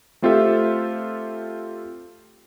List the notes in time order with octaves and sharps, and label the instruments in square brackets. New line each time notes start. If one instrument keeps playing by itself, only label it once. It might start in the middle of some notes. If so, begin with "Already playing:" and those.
[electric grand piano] A3 C4 F4 G4 A4 E5